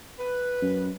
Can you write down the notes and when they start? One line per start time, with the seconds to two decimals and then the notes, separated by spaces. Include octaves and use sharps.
0.19 B4
0.62 F#2